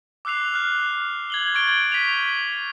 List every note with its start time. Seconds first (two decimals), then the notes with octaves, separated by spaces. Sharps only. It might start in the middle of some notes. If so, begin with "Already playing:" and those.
0.25 D6 E6 F#6 C7 F7
0.54 F6 F#6
1.30 G#6 F#7 G7
1.54 C#6 G#6 A6 D7 G7
1.68 G6 D7
1.92 B6 D#7 F7